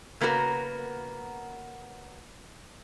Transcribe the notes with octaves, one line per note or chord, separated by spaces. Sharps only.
C#3 A#3 B3 F#4 A#4